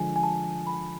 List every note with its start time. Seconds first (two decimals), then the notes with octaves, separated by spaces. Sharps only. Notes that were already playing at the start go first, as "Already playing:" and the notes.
Already playing: D3 F3 G#3 G#5
0.16 G#5
0.23 A5
0.67 B5